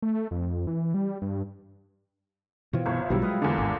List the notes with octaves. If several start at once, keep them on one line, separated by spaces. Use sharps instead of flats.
A3
F2
E3
G3
G2
B2 E3 C4 F4 C#5
G1 C2 C#5 C#6
A#1 B2 D3 F#3 G3 E4
G#3 B4 D#5 F5
E2 D3 A#3 A5 A#5
G#1 G#2